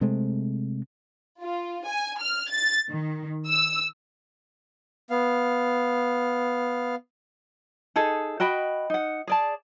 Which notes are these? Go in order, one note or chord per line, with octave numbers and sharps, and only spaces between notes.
C3 G#3 A3 C4
F4
G#5
F6
A6
D#3
E6
B3 F5
D#4 G#4 A4
F#4 D#5 G5 B5
D#4 F#5
G#4 D5 A5